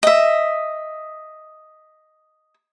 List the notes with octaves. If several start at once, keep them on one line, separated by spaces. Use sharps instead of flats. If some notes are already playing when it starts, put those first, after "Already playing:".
D#5 E5